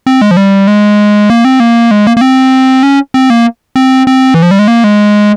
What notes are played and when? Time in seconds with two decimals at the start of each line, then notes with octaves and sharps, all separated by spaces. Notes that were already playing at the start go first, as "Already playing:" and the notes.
0.06 C4
0.21 G#3
0.31 F3
0.37 G3
0.67 G#3
1.30 A#3
1.45 C4
1.60 A#3
1.91 G#3
2.07 A#3
2.17 A#3
2.21 C4
2.83 C#4
3.14 C4
3.30 A#3
3.76 C4
4.07 C4
4.34 E3
4.42 F3
4.51 G3
4.59 G#3
4.68 A#3
4.84 G#3